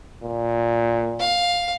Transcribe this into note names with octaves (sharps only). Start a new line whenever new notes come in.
A#2
F5